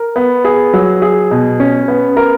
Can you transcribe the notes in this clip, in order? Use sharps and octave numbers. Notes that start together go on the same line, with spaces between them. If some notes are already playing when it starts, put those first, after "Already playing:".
Already playing: A#4
B3
G#4
F#3
G#4
B2
C#4
B3
A#4